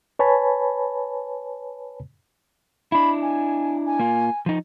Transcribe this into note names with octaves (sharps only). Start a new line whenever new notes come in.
B4 C#5 G#5 A5 B5
D4 E4 B5
G#5
G#5
A#3 F4
F3 D#4